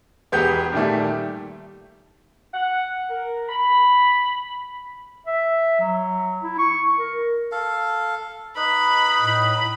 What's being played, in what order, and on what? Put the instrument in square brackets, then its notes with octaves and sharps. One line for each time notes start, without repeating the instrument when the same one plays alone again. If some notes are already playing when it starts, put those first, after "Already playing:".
[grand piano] E1 B3 G4 G#4 F#5 G6
A#2 D#3 G3 A3
[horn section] F#5
A#4
B5
[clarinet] E5
F#3
E4
C#6
A#4
[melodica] A4 F5
[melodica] D#4 B4 [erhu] B5
[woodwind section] A2